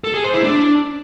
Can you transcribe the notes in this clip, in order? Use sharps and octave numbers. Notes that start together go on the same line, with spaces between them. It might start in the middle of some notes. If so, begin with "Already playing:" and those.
A4
G#4
C5
E4
D4